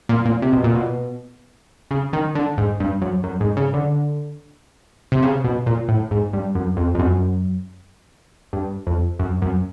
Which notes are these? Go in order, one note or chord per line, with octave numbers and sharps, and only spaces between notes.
A#2
A#2
C3
B2
A#2
B2
C#3
D#3
D3
G#2
G2
F#2
F#2
G#2
C#3
D3
C3
C#3
B2
A#2
A2
G#2
G2
F#2
F2
F2
F#2
G2
F2
F#2
F#2